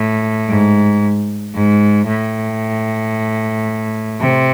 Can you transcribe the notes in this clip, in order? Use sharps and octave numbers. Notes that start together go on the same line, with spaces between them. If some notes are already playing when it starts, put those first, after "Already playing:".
Already playing: A2
G#2
G#2
A2
C3